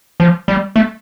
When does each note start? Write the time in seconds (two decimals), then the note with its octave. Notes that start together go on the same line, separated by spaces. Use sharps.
0.20 F3
0.48 G3
0.76 A3